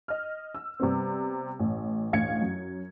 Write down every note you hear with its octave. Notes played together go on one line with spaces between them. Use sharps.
D#5 F6
E6
C3 G3 B3 C4
A1
A1 D2 F5 G#6 C#7
F#2